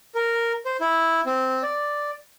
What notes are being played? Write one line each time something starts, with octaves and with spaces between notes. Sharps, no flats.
A#4
C5
E4
C4
D5